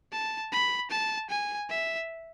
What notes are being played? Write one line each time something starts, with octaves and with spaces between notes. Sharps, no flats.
A5
B5
A5
G#5
E5